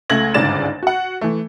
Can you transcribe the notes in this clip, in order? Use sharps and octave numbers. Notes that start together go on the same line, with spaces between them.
C#2 A3 G#6 A#6 F#7
G1 C#2 G#2 D5 A6 E7
F#4 F#5
E3 A3